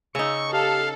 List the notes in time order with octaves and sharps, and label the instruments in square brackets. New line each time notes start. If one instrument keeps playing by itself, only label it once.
[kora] C#3 D#4 [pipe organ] C#6 [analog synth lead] E6
[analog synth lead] G4 [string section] A4 [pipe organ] F5